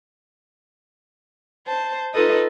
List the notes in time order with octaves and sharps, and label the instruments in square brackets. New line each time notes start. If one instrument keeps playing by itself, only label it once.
[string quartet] C5 A5
D#4 F4 A4 B4 D#5